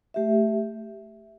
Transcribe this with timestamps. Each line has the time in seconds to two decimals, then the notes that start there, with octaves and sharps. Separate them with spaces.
0.14 A3 G4 E5